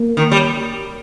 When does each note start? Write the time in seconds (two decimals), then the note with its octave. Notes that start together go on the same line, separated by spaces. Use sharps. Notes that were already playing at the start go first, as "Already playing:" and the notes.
Already playing: A#3
0.17 D#3
0.31 G3